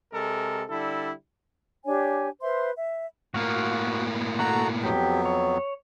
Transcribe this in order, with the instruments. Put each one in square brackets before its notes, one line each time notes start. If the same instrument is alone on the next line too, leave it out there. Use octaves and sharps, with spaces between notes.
[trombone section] C3 G#3 A4 A#4
D3 G3 E4 A4
[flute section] D4 G4 C#5 G#5
B4 C5 E5 C6
E5
[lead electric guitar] A2 A#3 [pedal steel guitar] F#4 F5
[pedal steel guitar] F#4 A4 F#5 [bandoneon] A#5
[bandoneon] F2 F#3 B3 [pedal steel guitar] G4
[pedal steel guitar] C#5